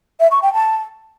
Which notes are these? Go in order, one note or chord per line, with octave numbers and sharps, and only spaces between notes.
E5
C#6
G5
A5